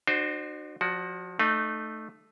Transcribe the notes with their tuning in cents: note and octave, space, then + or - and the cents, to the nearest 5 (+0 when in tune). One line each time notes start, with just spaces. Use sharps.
D4 +45 F#4 +0 C5 +0
F3 +30 F#4 +10 D5 +0
A3 +0 D#4 -25